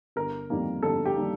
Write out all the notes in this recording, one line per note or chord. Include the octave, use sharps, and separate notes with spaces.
G1 A#4
F2 D#3 G3 A#3
G1 A4
G4
D#3 G3 A#3